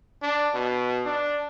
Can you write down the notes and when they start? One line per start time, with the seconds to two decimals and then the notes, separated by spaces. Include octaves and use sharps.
0.22 D4
0.54 B2
1.06 D4